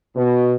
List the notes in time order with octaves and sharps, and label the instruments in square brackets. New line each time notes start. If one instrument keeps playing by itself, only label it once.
[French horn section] B2